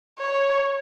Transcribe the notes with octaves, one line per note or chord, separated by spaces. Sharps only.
C#5